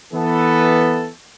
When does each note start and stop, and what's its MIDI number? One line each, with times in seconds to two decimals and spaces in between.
0.13 1.09 52
0.13 1.09 59
0.13 1.09 69